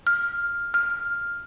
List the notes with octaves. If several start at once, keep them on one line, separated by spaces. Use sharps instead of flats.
F6
F6